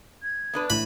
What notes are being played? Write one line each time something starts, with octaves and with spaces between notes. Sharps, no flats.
G#6
B3 D4 B4
A2 E3 B5